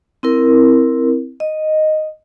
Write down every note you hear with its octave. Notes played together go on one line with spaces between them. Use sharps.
C4 E4 A#4
D#5